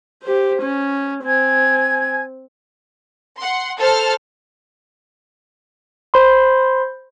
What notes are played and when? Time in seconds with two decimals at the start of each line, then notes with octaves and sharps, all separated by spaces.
0.23 G4 C5
0.62 C#4
1.25 C4 G#5 G#6
3.37 F#5 C6
3.79 A4 C5 A5 F6
6.14 C5 B5 C6